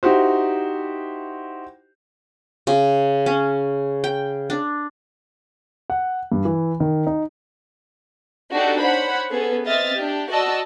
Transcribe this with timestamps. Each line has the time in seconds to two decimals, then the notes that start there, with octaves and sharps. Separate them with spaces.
0.03 D#4 E4 F#4 G4 C5
2.67 C#3
3.26 C#4
4.04 G5
4.50 D4
5.90 F#5
6.32 G2
6.45 E3
6.80 D#3
7.07 D#4
8.53 D4 D#4 F#4 G4 A4 D5
8.83 C5 C#5 F#5 B5
9.29 B3 C#4 G#4 A4
9.66 C4 D#5 E5 F6 A6
9.96 D4 G4
10.31 F#4 D5 D#5 A5 E6